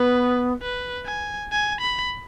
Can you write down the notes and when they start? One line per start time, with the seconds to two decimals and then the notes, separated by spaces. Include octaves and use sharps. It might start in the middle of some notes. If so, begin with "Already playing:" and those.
Already playing: B3 B4
0.62 B4
1.06 G#5
1.52 G#5
1.81 B5